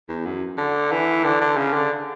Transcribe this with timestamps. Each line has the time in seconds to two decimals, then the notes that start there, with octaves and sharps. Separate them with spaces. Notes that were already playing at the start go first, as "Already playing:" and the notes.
0.09 E2
0.26 F#2
0.57 D3
0.92 E3
1.24 D3
1.41 D3
1.57 C#3
1.73 D3